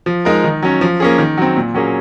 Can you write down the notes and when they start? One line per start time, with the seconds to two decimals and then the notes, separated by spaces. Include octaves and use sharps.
0.06 F3
0.25 G#3 D#4 A#4
0.44 D#3
0.62 F#3 C#4
0.81 F3
1.00 A#3 C#4 G#4
1.18 D#3
1.37 F#3 C4
1.57 A#2
1.74 F#3 A#3 C#4 G#4